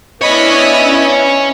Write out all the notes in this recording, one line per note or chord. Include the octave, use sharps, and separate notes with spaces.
B3 C#4 D4 E4 C#5 D#5 B5